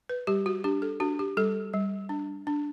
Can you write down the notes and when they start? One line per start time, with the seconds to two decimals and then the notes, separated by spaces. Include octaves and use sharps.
0.09 B4
0.27 G3 G4
0.46 F#4
0.64 D4 G4
0.82 A4
1.00 D4 F#4
1.19 G4
1.37 G3 A4
1.73 G3
2.09 D4
2.47 D4